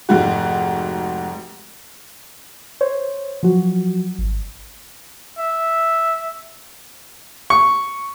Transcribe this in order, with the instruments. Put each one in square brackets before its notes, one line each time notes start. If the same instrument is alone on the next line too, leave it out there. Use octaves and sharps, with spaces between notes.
[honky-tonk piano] F1 G#2 F#4
[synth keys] C5 C#5
F3 F#3 F#4
G#1
[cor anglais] E5
[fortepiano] C#6